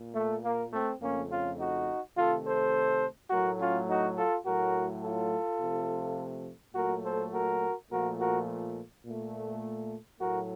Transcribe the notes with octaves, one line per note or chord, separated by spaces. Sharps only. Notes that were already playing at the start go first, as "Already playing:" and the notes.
Already playing: A#2
A3
A#3
A3 C4
F2 C#3 A3 A#3 C#4
C#4 F4
D#4 F#4
C3 D#3 A3 F4 A4
A4 C5
A2 F#3 A3 F#4 A#4
C#4 F4
D#4 F#4
F4 A4
A2 F#3 A3 F#4 A#4
F4 A4
C3 F3 A3
A#2 F#3 A3 F#4 A#4
A4 C5
F#4 A#4
A#2 F3 A3 F#4 A#4
F#4 A#4
A#2 A3
A2 F#3 A3 F#4 A#4